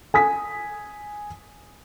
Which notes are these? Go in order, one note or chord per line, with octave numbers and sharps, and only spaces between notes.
G#5 D#6 B6